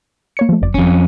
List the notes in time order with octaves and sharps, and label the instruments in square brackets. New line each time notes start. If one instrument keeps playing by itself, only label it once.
[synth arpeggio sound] A#3 C#5 C#7
F3 A3
G1 F#2 D5
[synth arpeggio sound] G1 [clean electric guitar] F2 C#4